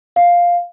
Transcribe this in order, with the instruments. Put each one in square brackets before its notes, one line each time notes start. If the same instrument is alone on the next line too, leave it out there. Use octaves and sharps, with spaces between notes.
[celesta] F5